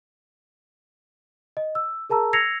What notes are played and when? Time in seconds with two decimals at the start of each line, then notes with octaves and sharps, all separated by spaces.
1.57 D#5
1.75 E6
2.10 G#4 A#4 A5 A#5 E6
2.33 E6 G#6 A#6 C7 C#7 F7